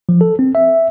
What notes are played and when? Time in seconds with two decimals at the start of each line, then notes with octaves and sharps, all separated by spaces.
0.09 F3
0.21 A4
0.39 C4
0.55 E5